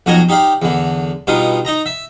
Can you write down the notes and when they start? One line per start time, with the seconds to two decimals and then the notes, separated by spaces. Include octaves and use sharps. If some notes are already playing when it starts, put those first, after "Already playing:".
0.06 B1 F2 F#4 D#5 G#5 A#5
0.29 D#4 G4 D5 F5
0.62 E2 D3
1.27 G2 B2 D#4 F4 D#6
1.65 D#4 D#5 A#5
1.86 E5